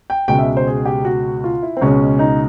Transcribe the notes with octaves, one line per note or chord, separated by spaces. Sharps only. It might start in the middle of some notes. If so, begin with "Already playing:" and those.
G5
C#2 B2 G#3 G5
E5
C5
G#4
G4
F#4
F4
E4
C4
C#2 B2 G#3 C#4
D#4